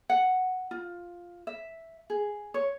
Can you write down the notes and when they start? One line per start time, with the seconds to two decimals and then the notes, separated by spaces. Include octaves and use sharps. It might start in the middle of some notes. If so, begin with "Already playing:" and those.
0.10 F#5
0.71 F4
1.47 E5
2.10 G#4
2.54 C#5